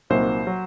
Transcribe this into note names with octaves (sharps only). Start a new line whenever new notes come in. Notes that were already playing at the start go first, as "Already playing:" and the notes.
C2 A#2 F#3 A#3 D#4 C5
F#3